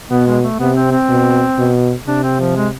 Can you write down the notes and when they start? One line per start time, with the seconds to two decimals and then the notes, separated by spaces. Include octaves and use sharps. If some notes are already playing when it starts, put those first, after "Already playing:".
0.11 B2 B3
0.27 G#3
0.43 A3
0.59 C3 B3
0.76 C4
0.92 C4
1.09 B2
1.58 B2
2.07 C3 D4
2.24 C4
2.40 F3
2.56 G#3